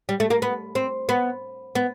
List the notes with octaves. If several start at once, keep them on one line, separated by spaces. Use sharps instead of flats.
G3
A3
A#3
B3
C4
B3
B3